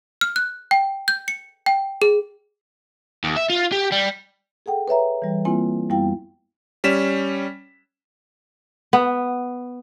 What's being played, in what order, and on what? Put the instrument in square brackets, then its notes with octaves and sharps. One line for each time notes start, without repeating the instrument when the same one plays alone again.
[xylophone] F6
F#6
G5
G6
C#7
G5
G#4
[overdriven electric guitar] D#2
E5
F4
G4
G3
[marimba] G#4 A4 F#5 G5
B4 C#5 E5 A#5
E3 G3
A#3 C4 E4 F4 G#5
F#2 G3 B3 E4 F5 G5
[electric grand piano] G3 C#4 B6 E7
[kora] B3